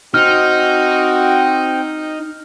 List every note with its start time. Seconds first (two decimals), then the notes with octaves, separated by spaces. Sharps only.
0.14 C4 D#4 F#4 G5 F6